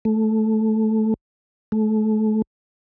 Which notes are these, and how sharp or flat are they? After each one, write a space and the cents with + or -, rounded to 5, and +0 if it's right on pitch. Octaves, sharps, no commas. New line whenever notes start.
A3 -10
A3 -30